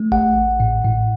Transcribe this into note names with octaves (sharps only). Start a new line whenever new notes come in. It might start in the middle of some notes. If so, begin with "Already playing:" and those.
Already playing: A3
A1 F#5
A1
A2
A2